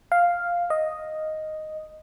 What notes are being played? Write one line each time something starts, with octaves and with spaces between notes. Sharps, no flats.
F5
D#5